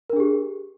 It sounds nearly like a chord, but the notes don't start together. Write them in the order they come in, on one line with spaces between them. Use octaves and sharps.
A#4 D4 G#4 G4